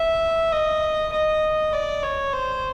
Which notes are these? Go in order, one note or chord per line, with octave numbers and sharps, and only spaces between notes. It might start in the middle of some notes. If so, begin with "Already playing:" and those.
Already playing: E5
D#5
D#5
D5
C#5
C5